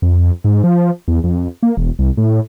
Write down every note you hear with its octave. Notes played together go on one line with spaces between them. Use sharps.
F2
G#2
F3
E2
F2
A#3
E1
C2
A2